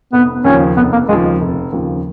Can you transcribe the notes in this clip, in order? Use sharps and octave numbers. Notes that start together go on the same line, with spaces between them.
F1 B3
D#2 C#3 F3 C#4
F1 B3
A#3
D#2 C#3 F3 G#3
F1
D#2 C#3 F3